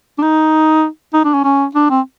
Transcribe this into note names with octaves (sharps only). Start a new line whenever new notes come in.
D4
D#4
D#4
D4
C#4
C#4
D4
C4